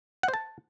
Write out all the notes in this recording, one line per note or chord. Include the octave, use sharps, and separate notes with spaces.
F#5
C5
A5